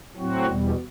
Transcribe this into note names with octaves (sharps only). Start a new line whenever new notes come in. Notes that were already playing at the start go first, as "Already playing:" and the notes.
A2 F#3 C4 F#4
E2 B2 G3